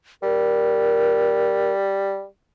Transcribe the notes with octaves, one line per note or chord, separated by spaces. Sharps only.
G3 A#4